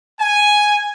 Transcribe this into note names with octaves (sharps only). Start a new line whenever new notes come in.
G#5